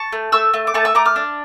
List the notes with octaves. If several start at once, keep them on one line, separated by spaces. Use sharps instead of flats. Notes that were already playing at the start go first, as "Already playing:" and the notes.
Already playing: A5 C#6
A3
A3 C#6 E6
A3
D6
A3 A5 C#6
C#6 E6
A3 A#5 D6
D6 F6
D4